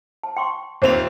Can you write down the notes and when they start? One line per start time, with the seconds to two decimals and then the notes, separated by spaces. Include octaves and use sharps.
0.23 A5
0.37 G5 C6 C#6
0.82 D#1 C4 C5 C#5 F7